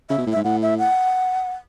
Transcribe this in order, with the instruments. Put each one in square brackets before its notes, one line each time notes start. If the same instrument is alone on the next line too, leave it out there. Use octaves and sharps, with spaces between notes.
[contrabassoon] C#3 [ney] E5
[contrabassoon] B2
A2
[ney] E5
[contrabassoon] G#2
[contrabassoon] A2 [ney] F#5
[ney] E5
F#5